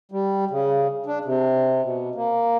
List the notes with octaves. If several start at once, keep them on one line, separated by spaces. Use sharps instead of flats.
G3
C#3
D4
C3
B2
A#3